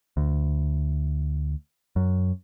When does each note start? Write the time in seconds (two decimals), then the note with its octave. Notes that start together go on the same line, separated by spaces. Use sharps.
0.17 D2
1.96 F#2